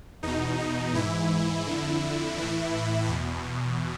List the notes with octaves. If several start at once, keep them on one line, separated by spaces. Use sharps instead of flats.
E2 B2 D#4
D#4
G#2 E3 E4
F2 D3
A2 E3
E2 B2